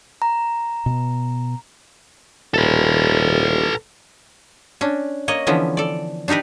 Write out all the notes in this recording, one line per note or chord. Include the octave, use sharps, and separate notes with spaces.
A#5
B2 B3
D#1 A4 B4
C#4 D4
A#3 C#5 D#5
D3 E3 F3 B3 C#4
A4 D5
D4 D#4 G4 A#4 B4